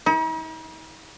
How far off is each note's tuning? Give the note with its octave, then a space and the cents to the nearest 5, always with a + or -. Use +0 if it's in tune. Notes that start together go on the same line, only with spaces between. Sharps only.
D#4 +45